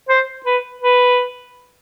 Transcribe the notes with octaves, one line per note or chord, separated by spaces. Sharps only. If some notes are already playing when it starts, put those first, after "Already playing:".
C5
B4
B4